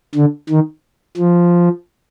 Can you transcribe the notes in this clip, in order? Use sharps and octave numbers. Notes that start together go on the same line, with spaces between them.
D3
D#3
F3